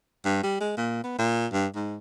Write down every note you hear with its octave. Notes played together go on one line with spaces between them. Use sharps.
G2
G3
G#3
A#2
B3
A#2
G2
G#2